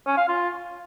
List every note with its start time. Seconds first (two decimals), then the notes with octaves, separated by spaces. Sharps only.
0.07 C#4
0.18 F5
0.28 F4